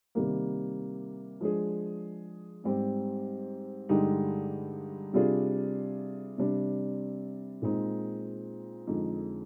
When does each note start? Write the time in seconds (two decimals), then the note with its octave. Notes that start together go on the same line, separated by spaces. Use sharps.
0.15 C3 D#3 G3 A#3
1.41 F3 G#3 D4 G#4
2.64 G#2 G3 C4 G4
3.89 G2 D3 G#3 D#4 G4
5.13 C3 G3 D4 F4 G#4
6.38 C3 G3 D4
7.62 A#2 G#3 C4 D#4
8.87 F2 D3 G#3 D#4